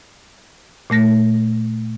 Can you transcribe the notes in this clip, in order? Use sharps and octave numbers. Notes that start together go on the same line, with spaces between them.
A#2 A3 A#6